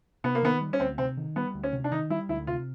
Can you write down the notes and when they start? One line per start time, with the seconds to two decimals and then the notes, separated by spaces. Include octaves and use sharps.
0.24 C3 B3
0.35 A#3
0.43 D#3 B3
0.61 G3
0.73 C#4
0.80 D2 C4
0.98 C3 C4
1.17 D#3
1.36 G3 B3
1.54 D2
1.64 C#4
1.73 C3
1.84 D4
1.92 D#3 D#4
2.10 G3 E4
2.29 D2 E4
2.47 C3 F4